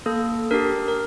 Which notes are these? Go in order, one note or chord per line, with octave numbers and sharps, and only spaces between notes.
A#3 A4
D4 G4 A#4
A#4